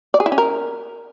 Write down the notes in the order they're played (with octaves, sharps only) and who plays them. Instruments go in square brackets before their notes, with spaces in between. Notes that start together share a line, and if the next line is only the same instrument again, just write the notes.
[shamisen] D5
G#4
E4
C#4
A#4